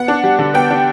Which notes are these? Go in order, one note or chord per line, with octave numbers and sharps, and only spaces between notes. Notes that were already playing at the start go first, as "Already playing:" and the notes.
Already playing: B3 F#5
D4
G3
D3
B3 G5
D4